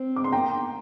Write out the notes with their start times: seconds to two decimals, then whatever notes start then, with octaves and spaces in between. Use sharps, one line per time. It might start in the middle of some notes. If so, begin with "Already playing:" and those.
Already playing: C4
0.16 D6
0.24 C6
0.32 A#3 G5 A#5